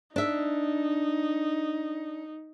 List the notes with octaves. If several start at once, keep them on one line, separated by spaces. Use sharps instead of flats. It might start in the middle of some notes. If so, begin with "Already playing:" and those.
D4 D#4 E5